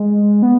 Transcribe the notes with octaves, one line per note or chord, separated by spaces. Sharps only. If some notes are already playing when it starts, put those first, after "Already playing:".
Already playing: G#3
B3